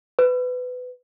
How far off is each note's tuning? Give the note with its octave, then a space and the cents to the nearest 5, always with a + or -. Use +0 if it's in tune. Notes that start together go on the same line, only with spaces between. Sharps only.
B4 +20